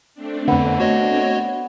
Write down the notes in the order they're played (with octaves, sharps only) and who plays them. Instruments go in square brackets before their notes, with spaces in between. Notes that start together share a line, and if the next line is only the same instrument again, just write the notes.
[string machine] A3 C4 D4
[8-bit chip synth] F2 D3 [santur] B3
[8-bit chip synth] F#4 C#5 D#5